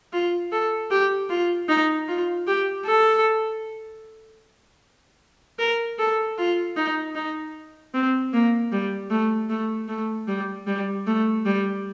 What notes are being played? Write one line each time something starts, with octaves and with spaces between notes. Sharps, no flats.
F4
A4
G4
F4
D#4
F4
G4
A4
A#4
A4
F4
D#4
D#4
C4
A#3
G3
A3
A3
A3
G3
G3
A3
G3